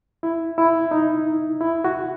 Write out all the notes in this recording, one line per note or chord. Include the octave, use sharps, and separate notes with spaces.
E4
E4
D#4
E4
F#4